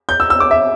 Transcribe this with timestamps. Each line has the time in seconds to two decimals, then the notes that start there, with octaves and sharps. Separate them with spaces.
0.09 G6
0.20 E6
0.30 E6
0.40 D6
0.51 E5